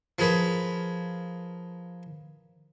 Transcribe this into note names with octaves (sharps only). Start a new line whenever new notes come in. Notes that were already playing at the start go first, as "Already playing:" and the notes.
F3 A#3 G#4 B4